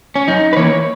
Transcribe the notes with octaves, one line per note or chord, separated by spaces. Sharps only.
C#4
F#2 D#4
B4
E3 A#3 C#5